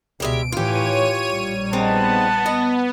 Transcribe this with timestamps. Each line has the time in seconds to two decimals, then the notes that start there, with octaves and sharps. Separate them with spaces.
0.20 C#2 B2 G3 G#3 E5 D7
0.52 A2 E3 F4 G4 C#5 D#7
1.29 A#1 G3
1.73 G#3 B3 C4 D#4 F#5 A5
2.46 D#5